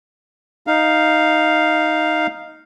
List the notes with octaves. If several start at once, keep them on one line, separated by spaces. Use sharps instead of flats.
D#4 F5